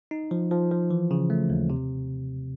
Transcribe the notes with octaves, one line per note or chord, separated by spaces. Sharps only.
D#4
F3
F3
F3
E3
C#3
A3
D#2
C3